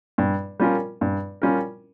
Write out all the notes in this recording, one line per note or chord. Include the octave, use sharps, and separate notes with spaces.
G2
G3 C#4 F4 A#4
G2
G3 C#4 F4 A#4